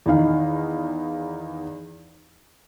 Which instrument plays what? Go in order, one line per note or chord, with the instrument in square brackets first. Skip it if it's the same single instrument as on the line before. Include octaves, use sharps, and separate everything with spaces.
[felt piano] E2 D#3 D#4 F5